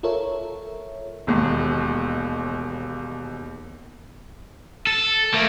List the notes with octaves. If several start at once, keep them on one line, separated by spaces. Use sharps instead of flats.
F4 A4 A#4 C#5 E5
E1 D#2
A4
A3 A#3